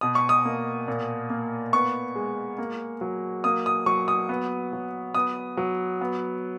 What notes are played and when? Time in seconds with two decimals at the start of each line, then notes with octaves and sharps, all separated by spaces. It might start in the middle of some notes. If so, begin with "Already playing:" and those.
0.01 B2 D#6
0.15 C#6
0.29 D#6
0.45 A#3
0.88 A#2
1.30 A#3
1.73 B3 C#6
2.16 G#3
2.58 A#3
3.01 F#3
3.44 A#3 D#6
3.66 D#6
3.86 F#3 C#6
4.08 D#6
4.29 B3
4.73 F#3
5.14 B3 D#6
5.57 F#3
6.01 B3